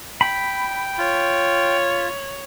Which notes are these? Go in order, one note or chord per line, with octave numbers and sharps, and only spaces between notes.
G5 B5
F4 C#5